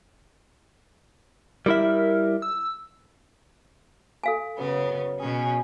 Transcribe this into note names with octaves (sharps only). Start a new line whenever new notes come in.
G3 E4 A#4 E5
E6
A4 F5 G#5
F#2 C#3 B3
B2 C#4 G#4